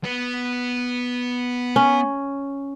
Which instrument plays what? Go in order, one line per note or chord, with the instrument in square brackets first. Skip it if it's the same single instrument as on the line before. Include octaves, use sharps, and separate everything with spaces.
[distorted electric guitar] B3
[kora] C#4